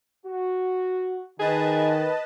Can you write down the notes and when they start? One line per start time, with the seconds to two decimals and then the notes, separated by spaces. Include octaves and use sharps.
0.26 F#4
1.40 D#3 G#4 B4 D#5 A5